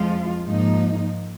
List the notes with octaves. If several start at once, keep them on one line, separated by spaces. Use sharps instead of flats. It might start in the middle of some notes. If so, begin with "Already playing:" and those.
Already playing: F2 F3 G#3 F4
G#2 F3 A#3 D#4